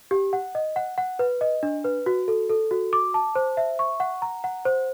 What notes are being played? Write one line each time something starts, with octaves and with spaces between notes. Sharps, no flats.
G4
F#5
D#5
F#5
F#5
B4
D#5
D4
B4
F#4
A4
A4
F#4
D6
A5
C5
E5
C#6
F#5
A#5
F#5
C5